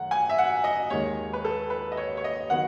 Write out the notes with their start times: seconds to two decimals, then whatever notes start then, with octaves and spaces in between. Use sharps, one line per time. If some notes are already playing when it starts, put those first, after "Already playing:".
Already playing: F#2 D#3 A3 F#5
0.11 G#5
0.29 E5
0.38 F#5
0.64 D#5
0.90 D#2 D#3 G#3 C#5
1.33 B4
1.45 A4
1.70 B4
1.92 D#5
1.97 C#5
2.17 C#5
2.24 D#5
2.50 D#3 F#3 B3 F#5